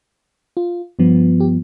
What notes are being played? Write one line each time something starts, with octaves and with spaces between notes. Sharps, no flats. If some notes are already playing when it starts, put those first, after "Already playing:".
F4
G2 F3 B3
G4